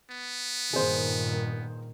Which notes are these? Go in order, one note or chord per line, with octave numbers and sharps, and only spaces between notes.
B3
G2 A#2 D#3 G#4 C5